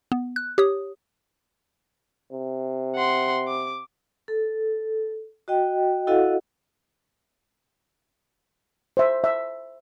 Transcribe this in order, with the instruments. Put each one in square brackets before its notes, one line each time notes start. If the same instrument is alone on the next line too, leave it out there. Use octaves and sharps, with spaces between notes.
[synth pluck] B3
F#6
G4 C#5 D#6
[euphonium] C3
[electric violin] F#5 C6
D6
[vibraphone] A4
F#4 D#5 G5
E4 F#4 A4 D#5 F5 F#5
[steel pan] C5 E5
E5